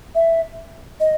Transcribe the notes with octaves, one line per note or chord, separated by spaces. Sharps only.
E5
D#5